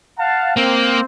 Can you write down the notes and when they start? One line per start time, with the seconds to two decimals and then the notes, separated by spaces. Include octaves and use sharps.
0.19 F5 F#5 A5
0.57 A#3 C4